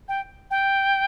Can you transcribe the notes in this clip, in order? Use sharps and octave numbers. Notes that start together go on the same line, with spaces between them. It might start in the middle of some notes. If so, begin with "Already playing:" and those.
G5
G5